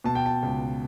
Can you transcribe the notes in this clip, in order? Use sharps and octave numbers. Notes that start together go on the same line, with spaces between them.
B2 A5
G5
A5
C#2